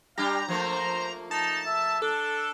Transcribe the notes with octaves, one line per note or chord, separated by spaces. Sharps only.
G3 D4 G4 F5 A#5
F3 A3 A#3 C5
D#4 A5
E5
D4 A4